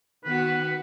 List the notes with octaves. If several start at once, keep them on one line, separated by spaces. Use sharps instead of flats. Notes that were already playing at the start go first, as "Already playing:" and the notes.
D#3 B3 F#4 B4